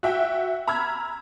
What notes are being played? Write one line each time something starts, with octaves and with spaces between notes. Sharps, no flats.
F#4 E5 G5
A#5 B5 E6 F6 G#6